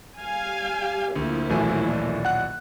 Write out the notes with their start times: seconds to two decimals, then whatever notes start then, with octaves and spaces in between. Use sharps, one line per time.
0.19 G3 F5 G#5
0.81 G4
1.16 D2 F3 A#3 E4
1.50 D#1 B1 E3 A3 F#4 G#5
1.86 D5
2.25 F#5 F#6